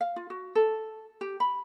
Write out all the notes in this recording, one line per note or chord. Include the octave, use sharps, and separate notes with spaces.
F5
F4
F#4
A4
G4
B5